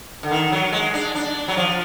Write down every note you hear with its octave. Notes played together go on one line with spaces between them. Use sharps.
D3
D#3
F#3
G#3
D4
D4
F#3
F3